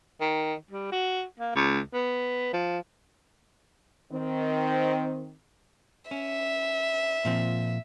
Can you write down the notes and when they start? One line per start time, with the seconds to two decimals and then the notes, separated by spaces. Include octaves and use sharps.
0.21 D#3
0.71 G3
0.92 F#4
1.39 A#3
1.55 C#2
1.93 B3
2.53 F3
4.12 D#3 C4
6.11 C#4 E5
7.25 A#2 F3 C4